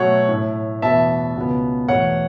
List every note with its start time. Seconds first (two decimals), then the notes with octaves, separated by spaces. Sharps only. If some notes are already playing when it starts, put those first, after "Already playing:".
Already playing: B2 F#3 A3 C#5 F#5
0.29 A2 A3
0.82 E2 B2 B3 E5 A5
1.36 C#2 B2 B3
1.88 E2 B2 A3 C#5 F#5